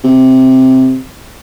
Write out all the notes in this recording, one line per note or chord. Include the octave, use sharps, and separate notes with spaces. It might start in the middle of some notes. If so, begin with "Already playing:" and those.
C3